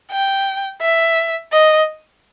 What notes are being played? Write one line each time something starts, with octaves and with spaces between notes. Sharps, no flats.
G5
E5
D#5